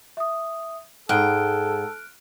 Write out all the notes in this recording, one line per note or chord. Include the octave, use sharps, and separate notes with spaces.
E5 D#6
G#2 G#4 A4 G5 F6 F#6 D7